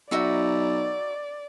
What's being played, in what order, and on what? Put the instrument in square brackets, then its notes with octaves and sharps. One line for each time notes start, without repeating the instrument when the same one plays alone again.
[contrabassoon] B1 [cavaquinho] D#4 F#4 E5 [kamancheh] D5